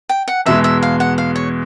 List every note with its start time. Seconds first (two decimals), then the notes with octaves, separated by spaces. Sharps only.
0.09 G5
0.28 F#5
0.46 E2 B2 G#3 E5
0.64 E5
0.83 F5
1.00 F#5
1.18 F5
1.36 C#5